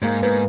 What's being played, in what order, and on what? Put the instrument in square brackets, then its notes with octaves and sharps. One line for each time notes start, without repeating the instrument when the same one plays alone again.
[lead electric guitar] G#2 [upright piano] A#3
[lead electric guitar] G#2 [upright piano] B3